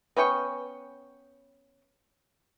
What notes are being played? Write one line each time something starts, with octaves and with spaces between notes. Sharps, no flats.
B3 C#4 G5 C#6